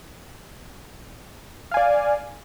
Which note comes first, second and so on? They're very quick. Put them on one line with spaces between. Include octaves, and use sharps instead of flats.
F5 G#5 D5